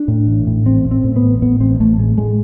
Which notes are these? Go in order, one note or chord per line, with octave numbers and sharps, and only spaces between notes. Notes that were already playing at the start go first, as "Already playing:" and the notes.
Already playing: D4
A2
A1
A2
A1 C4
A2
C4
A2
B3
A1
A2 B3
A1 C4
A1 A3
A2 G#3
A2 G#3